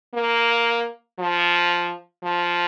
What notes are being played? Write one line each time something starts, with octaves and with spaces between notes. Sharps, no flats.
A#3
F3
F3